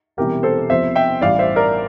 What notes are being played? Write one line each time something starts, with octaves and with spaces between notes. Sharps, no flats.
E1 E2 C3 E3 G3 G4 A#4
A4 C5
E2 C3 F3 C5 E5
E5 G5
A1 G2 E3 D5 F5
C5 E5
A#4 D5